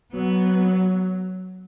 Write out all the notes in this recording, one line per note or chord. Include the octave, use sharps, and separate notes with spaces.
F#3 B3